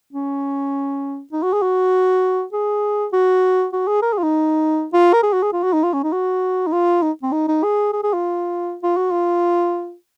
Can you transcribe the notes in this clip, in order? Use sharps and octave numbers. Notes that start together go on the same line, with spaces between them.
C#4
D#4
F#4
G#4
F#4
G#4
F#4
F#4
G#4
A#4
G#4
F4
D#4
F4
A#4
G#4
F#4
G#4
F4
F#4
D#4
F4
C#4
D#4
F#4
D#4
F4
D#4
C4
D#4
D#4
G#4
G#4
G#4
F4
F4
F#4
F4